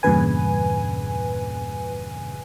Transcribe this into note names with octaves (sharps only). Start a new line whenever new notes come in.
E2 G2 A#2 C#3 B4 G#5